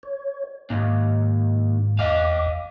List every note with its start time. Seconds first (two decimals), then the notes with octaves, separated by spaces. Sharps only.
0.03 C#5
0.70 D#2 G#2
1.99 E2 D#5 F5 D6